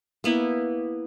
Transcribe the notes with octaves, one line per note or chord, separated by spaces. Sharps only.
A#3 B3 E4